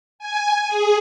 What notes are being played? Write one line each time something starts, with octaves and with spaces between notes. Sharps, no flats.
G#5
G#4